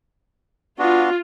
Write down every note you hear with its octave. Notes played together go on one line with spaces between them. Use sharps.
B3 D4 F4 F#4